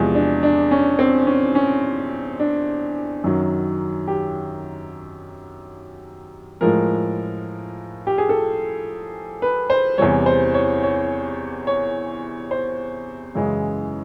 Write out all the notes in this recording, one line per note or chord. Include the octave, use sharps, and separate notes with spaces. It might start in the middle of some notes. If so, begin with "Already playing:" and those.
Already playing: E2 C3 F3 G#3
D4
D4
C#4
C4
C#4
C#4
D4
F#2 D#3 F#3
G4
A2 F3 G#3 A#4
G4
G#4
A4
B4
C5
E2 C3 E3 G3 C#5
C5
C#5
C#5
C#5
C5
F#2 C#3 E3 G#3